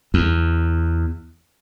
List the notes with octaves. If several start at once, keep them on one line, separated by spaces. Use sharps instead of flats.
E2